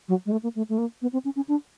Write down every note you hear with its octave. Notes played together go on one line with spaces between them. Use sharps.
F#3
G#3
A3
A#3
A3
A3
A#3
B3
C4
C#4
C#4
D4